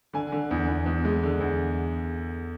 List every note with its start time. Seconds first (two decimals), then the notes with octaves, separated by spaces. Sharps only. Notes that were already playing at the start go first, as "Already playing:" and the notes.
0.13 D3 G#5
0.32 D3
0.51 E2
0.68 E2
0.86 E2
1.05 G#3
1.23 D3
1.40 E2